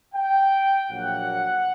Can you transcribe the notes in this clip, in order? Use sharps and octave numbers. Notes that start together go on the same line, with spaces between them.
G5
A#1 A#2 F#3 A#3 F#5